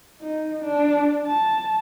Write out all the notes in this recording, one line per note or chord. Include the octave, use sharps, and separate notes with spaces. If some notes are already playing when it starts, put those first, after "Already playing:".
D#4
D4
A5